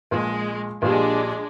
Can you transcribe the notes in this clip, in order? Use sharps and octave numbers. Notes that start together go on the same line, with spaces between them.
A#1 G#3
A#1 G3 G#3 D4